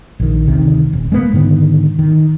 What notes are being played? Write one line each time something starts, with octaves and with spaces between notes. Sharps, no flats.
A#1 D#3
D2 C3 D#3
D#1
G#3 A#3 B3
G#2 D3 D#3 B3
D#3